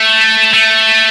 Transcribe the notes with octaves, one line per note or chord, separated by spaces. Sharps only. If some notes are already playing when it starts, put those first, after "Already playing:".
Already playing: A3
A3